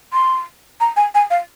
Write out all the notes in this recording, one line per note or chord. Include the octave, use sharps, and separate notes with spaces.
C6
A#5
G#5
G#5
F5